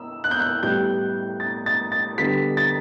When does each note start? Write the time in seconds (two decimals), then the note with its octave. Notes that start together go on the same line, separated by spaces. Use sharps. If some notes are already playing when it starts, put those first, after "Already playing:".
Already playing: E6
0.24 F#6
0.31 G6
0.40 F#6
0.63 A2 G3 B3 G6
1.40 A6
1.66 A6
1.92 A6
2.18 D3 G3 B3 B6
2.57 A6